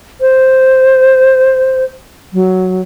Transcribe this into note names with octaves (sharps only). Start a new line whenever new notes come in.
C5
F#3